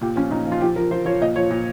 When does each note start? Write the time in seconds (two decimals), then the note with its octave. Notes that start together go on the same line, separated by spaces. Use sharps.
0.01 A#2 G4
0.16 F3 C#4
0.31 A#2 D#4
0.47 F3 F4
0.61 F3 G4
0.76 F3 A#4
0.91 F3 C5
1.06 F3 C#5
1.21 A#2 D#5
1.36 F3 C#5
1.50 A#2